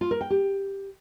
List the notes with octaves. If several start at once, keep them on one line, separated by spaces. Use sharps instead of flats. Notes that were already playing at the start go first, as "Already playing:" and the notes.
F4
A#4
G5
G4